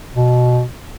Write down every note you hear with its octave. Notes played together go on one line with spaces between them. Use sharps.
B2